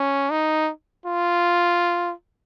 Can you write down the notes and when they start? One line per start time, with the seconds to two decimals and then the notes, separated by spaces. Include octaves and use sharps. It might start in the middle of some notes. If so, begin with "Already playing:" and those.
Already playing: C#4
0.31 D#4
1.06 F4